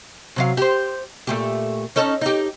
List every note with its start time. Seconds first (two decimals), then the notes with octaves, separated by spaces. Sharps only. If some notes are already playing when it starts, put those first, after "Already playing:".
0.36 C3 F#3 F5
0.57 G4 C5
1.27 A#2 A3 G4
1.96 C#4 D#4 A4
2.21 D#4 G4